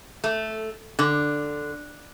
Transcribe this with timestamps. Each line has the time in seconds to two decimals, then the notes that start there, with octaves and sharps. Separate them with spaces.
0.24 A3
0.99 D3